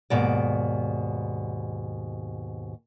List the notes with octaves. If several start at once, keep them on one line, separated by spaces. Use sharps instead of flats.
D#2 G#2 B2 D5